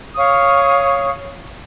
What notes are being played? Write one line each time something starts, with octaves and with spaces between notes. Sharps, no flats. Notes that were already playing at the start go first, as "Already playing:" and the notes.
C#5 F5 C#6 D#6